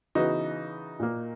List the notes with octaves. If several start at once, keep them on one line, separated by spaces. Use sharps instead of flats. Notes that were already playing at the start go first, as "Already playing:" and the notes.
C#3 E3 B3 D#4 F#4
A#2 A#3